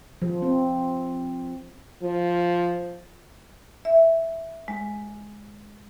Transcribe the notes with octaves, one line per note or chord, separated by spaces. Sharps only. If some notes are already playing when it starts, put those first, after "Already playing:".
F3
C4
F3
E5
G#3